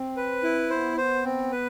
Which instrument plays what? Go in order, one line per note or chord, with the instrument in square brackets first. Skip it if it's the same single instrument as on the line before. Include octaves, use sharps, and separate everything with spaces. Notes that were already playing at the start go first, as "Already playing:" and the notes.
Already playing: [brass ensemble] C4
[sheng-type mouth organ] B4
E4
[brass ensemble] B3 [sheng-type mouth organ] C5
[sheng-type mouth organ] C5
C4
B4